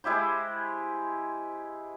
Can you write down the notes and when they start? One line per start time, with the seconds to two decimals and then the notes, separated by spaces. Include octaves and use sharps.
0.04 G#3 E4 G4 C5